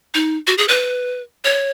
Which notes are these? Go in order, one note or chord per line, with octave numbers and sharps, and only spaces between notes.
D#4
F#4
G#4
B4
C#5